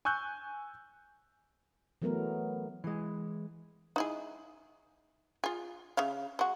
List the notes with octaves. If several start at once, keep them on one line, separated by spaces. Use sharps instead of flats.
G#5 C#6 E6 F#6 G6
E3 F#3 A3 B3 A#4
E3 G#3
D#4 E4 G#4
F4 G#4
C#3 E5 F5
G#3 F#4